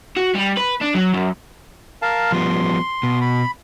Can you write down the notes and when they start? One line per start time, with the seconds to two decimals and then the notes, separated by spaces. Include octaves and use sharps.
0.17 F#4
0.35 G3
0.57 B4
0.81 D4
0.94 F#3
1.14 F#2
2.02 A#4 F5 A5
2.32 F3 G3 B3 C6
3.03 B2
3.21 B5